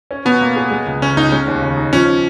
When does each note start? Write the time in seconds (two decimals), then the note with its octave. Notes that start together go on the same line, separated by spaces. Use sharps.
0.11 C#4
0.25 B2 B3
0.41 A#3
0.56 G#4
0.71 G#3
0.86 C#2
1.02 C#3 C#4
1.17 C#2 D#4
1.32 G#3 C#4
1.47 D#2
1.62 C#3
1.77 D#4
1.93 F3 C#4